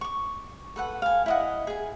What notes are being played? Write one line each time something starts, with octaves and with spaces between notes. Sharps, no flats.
C#6 D6
A4 B4 F#5
F5 G#5
E4 D#5 F#5
G#4 G#5